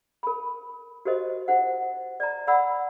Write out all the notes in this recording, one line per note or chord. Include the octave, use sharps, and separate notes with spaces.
A#4 B5
F#4 G4 A#4 C5 D#5
E4 C5 F#5
D5 A#5
D5 F#5 B5 E6